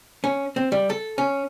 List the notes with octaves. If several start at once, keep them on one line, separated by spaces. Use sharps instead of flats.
C#4
C4
G3
A4
C#4